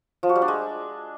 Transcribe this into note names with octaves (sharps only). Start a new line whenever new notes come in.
F3
F#4
G3
D4
G#3